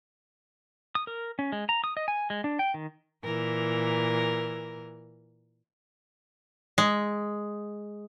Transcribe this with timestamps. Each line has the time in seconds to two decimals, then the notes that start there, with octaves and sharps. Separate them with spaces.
0.95 D#6
1.07 A#4
1.39 C#4
1.52 G#3
1.69 A#5
1.84 D#6
1.97 D#5
2.08 G#5
2.30 G#3
2.44 D4
2.59 G5
2.74 D#3
3.23 A#2 E3 A#4
6.78 G#3